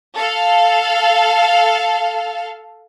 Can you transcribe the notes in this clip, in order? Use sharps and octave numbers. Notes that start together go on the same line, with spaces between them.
A4 F5